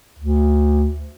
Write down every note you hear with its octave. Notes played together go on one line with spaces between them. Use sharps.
D2